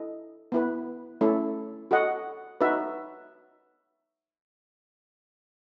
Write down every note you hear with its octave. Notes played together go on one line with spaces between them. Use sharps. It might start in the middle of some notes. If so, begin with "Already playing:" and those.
Already playing: E4 A4 D#5
B3 E4 B4
A3 C#4 E4 A4
F#4 A4 D#5 F#5
D#4 F#4 B4 E5